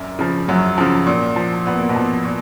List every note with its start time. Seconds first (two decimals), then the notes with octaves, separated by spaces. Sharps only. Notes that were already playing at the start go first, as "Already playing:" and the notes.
Already playing: F#2 A#2 A#3
0.19 C#3 F3
0.48 F#2 F#3
0.78 C#3 F3
1.07 A#2
1.36 F3
1.66 A#2 B3
1.79 A#3
1.89 B2 B3
1.96 F3
2.25 A#2